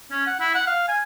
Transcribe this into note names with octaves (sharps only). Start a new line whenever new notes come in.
C#4
F#5
E4
F#5
F5
G#5